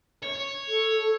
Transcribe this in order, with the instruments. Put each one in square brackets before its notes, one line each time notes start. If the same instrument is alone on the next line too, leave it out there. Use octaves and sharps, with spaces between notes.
[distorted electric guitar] C#5
[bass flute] A4